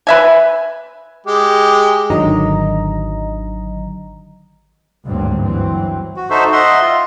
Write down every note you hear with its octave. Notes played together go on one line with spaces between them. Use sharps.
B4 E5 G#5
G#3 G4
G#1 D3 D#3 F#3 D#5 A#5
G#1 D2 G2 F#3 A#3 C4
G1 E3 F#3 C4
F#4
D#4 F#4 A4 C5 E5
D#5 E5 F#5 C6
F4